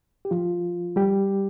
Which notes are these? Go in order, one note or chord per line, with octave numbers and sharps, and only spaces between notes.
G4
F3 F4
G3 G4